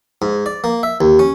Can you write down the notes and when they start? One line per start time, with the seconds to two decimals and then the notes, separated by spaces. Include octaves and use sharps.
0.22 G#2
0.46 D5
0.64 A#3
0.83 E5
1.01 D#2
1.19 C#4